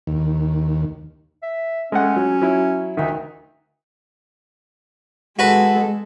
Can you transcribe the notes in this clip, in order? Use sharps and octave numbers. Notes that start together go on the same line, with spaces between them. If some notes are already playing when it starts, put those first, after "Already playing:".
D#2
E5
G#3 A3 C#4 F#5
F#3
F#3 E4
D2 D#3 E5
G#3 F#4 A4 B4